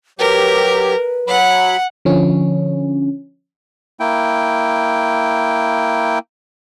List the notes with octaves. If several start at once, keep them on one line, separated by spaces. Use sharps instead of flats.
F#3 G4 A#4 B4
F#3 F#5 B5
D3 F3 C#4
A#3 E4 G5